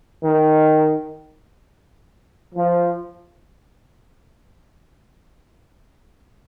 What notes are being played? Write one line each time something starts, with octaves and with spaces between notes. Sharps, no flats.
D#3
F3